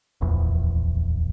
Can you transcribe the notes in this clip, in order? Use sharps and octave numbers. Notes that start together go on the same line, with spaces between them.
D1 A#1 E2